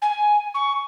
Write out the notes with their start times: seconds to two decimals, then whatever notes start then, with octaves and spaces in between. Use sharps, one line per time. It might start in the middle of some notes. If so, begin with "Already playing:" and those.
0.02 G#5
0.54 C#6